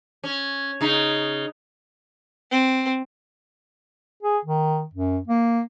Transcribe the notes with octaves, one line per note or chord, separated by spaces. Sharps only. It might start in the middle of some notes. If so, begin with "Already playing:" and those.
C#4
C#3 D#4
C4
G#4
D#3
F#2
A#3